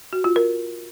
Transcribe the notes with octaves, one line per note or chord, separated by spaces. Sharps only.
F#4
F4
A#4